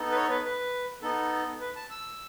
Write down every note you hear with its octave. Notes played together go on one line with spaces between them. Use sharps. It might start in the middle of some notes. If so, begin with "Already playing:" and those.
Already playing: B3 D#4 A4
B4
C#5
B4
B4
B3 D#4 A4
B4
A5
E6